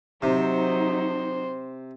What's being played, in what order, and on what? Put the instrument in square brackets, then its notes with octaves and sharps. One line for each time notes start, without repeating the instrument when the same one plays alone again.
[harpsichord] C3 [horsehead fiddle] F#3 D#4 [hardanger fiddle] C5